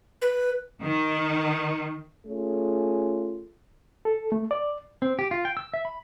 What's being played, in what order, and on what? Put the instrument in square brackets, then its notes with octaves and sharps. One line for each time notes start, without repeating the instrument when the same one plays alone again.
[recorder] B4
[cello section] D#3
[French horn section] A3 C#4 F4 G#4
[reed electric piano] A4
A3
D5
[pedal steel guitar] C4
G4
F4
G5
E6
E5
B5